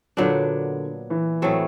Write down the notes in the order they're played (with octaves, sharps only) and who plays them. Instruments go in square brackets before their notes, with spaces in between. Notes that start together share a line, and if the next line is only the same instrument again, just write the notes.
[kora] A#2 F#3 B3 D4 [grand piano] D3
[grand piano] E3
[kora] A2 F#3 A3 C4